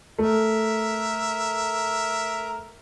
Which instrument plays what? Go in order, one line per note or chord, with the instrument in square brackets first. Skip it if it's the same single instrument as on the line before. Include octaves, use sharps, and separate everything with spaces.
[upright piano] A3 [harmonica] A#4 E5